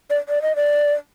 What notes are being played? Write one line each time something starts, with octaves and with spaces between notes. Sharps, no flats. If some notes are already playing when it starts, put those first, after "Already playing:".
D5
D5
D#5
D5